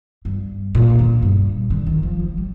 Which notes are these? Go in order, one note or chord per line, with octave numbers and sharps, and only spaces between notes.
G2
A#2
D3
G2
D3
D#3
F3
F3
G3